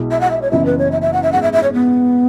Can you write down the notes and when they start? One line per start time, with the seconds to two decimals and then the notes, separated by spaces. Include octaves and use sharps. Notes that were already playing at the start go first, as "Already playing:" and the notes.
Already playing: B1 B2 G#3 E4
0.11 E5
0.21 F#5
0.31 E5
0.42 C#5
0.51 F#1 F#2 E3 B3 E5
0.66 B4
0.79 C#5
0.92 E5
1.02 E5
1.13 F#5
1.23 E5
1.32 G#2 G#3 B3 F#5
1.43 E5
1.53 E5
1.63 C#5
1.73 B3